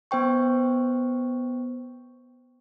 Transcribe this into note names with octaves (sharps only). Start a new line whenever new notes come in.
B3 C5 G5 C#6